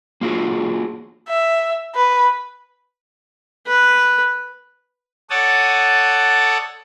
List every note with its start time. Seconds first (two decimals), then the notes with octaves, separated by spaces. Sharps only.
0.21 A#3 F4 F#4 G#4
1.28 E5
1.95 B4
3.67 B4
5.30 A4 C#5 D5 F#5 A5 D#6